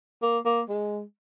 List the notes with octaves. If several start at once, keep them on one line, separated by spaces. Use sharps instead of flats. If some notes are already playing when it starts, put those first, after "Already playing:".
A#3
A#3
G#3